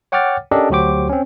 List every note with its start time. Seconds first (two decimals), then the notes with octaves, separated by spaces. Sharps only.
0.12 C#5 F#5 G5 D6 F6 A6
0.51 C#4 D4 G4 A4 A#4 D#5
0.70 D2 F#3 F#4 G4 C5 D6
1.10 C4 C#4